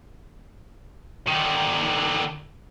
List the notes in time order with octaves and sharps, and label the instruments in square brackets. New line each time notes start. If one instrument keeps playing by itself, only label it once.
[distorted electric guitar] D3 D#3